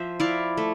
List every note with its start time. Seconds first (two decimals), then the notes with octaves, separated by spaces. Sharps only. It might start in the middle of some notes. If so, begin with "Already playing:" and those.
Already playing: F3 C5 E5
0.20 E4 D5 F5
0.57 A3